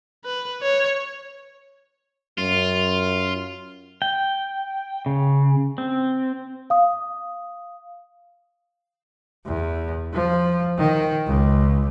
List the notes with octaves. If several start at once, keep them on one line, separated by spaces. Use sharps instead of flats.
B4
C#5
F#2 F4
G5
C#3
C4
F5 D#6
E2
F3
D#3
C#2